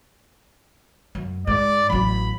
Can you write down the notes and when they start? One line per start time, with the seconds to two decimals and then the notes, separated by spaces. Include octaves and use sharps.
1.15 F#2
1.47 G#2 D5
1.90 A1 F#3 B5